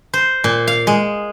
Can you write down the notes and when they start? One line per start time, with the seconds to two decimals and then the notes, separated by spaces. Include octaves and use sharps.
0.13 C5
0.44 A#2
0.67 F5
0.87 G#3